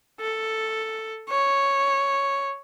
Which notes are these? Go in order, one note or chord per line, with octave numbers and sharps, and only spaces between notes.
A4
C#5